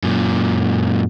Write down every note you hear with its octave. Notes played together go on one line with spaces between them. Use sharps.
F#2 A#2